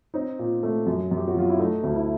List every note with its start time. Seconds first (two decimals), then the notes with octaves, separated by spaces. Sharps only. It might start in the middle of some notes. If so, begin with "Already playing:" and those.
0.14 C4 D#4
0.39 A#2
0.63 A3
0.87 F#2
1.11 F#2
1.17 G4
1.28 F#4
1.35 F#3 F4
1.49 E4
1.59 A3 D#4
1.83 D2
1.96 E4